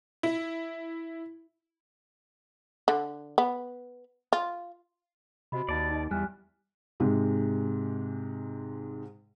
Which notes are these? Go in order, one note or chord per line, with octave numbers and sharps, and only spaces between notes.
E4
D3
B3
F4
C3 F#4 D#5 B5
D#2 D5 A5
D#4 D#5
E2 G3 G#5 F6 F#6
G#2 C3 G#3